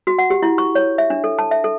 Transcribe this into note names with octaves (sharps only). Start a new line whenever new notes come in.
F#4
F#5
G4
E4
C#6
C#5
E5
D4
A4
A5
E5
A4